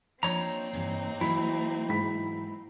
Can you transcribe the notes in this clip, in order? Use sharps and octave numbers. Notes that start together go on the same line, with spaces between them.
F3 A#3 C4 D4 D#4 C#5 A#5
G2 C3 E3
E3 F#3 E4
G#2 B5 B6